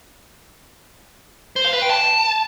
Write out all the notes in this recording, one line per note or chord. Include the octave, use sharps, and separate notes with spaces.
C5
F5
B4
G5
A5